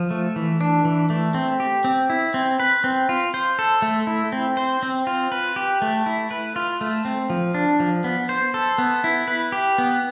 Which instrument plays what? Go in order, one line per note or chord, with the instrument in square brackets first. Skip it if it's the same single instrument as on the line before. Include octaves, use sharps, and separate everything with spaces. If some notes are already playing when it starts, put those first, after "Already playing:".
Already playing: [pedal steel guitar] F3
A3
E3
D4
E3
A3
C4
G4
C4
E4
C4
B4
C4
F4
C5
A4
A3
E4
C4
C5
C4
F4
B4
G4
A3
E4
B4
F4
A3
C4
F3
D4
F3
B3
C5
A4
B3
E4
B4
G4
B3